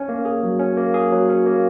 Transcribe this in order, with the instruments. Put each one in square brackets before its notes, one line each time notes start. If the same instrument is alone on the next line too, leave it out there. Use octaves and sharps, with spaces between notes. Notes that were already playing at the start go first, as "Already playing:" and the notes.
Already playing: [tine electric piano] C#4
A#3
G#4
F#3
C#4
A#3
G#4
F#3
C#4
A#3